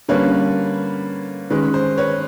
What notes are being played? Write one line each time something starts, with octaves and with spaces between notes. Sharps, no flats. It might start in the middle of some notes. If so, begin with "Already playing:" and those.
D3 G3 A#3 C#4 B4 C#5
D#3 G#3 C#4 B4
C5
B4 C#5